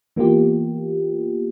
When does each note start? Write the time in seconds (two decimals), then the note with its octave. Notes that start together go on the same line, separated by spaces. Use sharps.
0.16 E3 A#3 B3 F4 G4